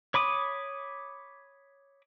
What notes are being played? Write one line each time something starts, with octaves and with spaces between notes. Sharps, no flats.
C#5 B5 D6 D#6